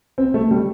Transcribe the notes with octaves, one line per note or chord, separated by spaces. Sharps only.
C4
A3
G3